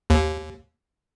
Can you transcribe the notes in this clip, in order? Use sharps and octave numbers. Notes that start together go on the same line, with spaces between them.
D#2